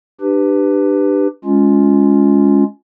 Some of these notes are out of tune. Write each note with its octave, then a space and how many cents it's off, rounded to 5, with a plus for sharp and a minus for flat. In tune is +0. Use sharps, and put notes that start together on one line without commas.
D4 +25 G4 +0 B4 +10
G#3 +0 C#4 +10 F4 +0